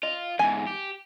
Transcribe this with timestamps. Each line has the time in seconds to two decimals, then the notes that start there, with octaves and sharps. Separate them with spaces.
0.03 F4 D#5
0.39 E2 G#2 G#5
0.67 G4